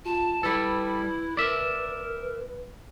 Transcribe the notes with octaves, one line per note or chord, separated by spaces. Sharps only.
F4 A5
G3 E4 A4 B4
A#4 D5 E5